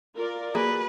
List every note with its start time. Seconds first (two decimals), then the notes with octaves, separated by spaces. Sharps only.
0.16 F4 A#4 D5
0.55 A#3 F#4 G#4 B4